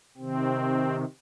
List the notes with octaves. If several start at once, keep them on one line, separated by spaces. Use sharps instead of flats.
C3 D#3 C4